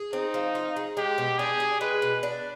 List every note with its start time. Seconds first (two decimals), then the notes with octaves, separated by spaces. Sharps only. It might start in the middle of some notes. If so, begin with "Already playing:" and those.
Already playing: G#4
0.13 C4 D#4
0.34 F3
0.55 F4
0.76 G#4
0.97 G#3 G4
1.18 B2
1.38 D4 G#4
1.60 G4
1.80 G#3 B4
2.02 B2
2.23 D4